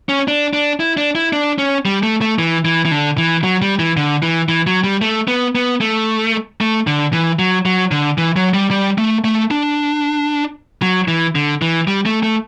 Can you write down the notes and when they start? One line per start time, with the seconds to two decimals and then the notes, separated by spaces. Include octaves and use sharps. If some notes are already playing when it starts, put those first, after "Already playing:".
0.09 C#4
0.28 D4
0.53 D4
0.80 E4
0.97 D4
1.15 E4
1.33 D4
1.58 C#4
1.86 G3
2.03 A3
2.21 A3
2.39 E3
2.65 E3
2.85 E3
2.91 D3
3.18 E3
3.44 F#3
3.62 G3
3.79 E3
3.97 D3
4.23 E3
4.49 E3
4.67 F#3
4.84 G3
5.02 A3
5.28 B3
5.55 B3
5.81 A3
6.61 A3
6.87 D3
7.13 E3
7.39 F#3
7.66 F#3
7.91 D3
8.18 E3
8.36 F#3
8.54 G3
8.71 G3
8.98 A3
9.24 A3
9.51 D4
10.82 F#3
11.08 E3
11.35 D3
11.62 E3
11.87 G3
12.06 A3
12.23 A3